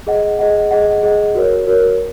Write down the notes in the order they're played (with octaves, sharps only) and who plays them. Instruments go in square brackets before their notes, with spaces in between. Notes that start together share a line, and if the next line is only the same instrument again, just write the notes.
[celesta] G#4 D#5 F#5
G#4 D#5 F#5
G#4 D#5 F#5
G#4 D#5 F#5
F#4 A#4 C#5
F#4 A#4 C#5